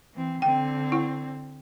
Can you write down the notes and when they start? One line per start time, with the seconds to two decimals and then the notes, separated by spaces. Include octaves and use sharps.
0.14 E3 C4
0.42 D3 C4 G5
0.92 E4